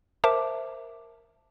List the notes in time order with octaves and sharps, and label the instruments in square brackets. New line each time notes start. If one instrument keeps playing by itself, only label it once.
[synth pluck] A#4 C5 E5 A5 D6